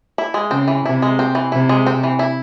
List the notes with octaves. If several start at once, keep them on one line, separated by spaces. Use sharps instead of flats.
E4
G#3
C#3 C4
E3
C3 E4
G#3
C4
E3
C3 E4
G#3
C4
E3
E4